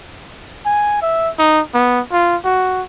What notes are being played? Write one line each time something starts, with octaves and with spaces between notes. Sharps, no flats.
G#5
E5
D#4
B3
F4
F#4